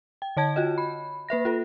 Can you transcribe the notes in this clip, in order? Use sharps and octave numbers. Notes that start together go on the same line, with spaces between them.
G5
D3 C#5 A5 G#6
F4 F#4 D#5
B5
A#3 B4 E5 A#6
F4 A4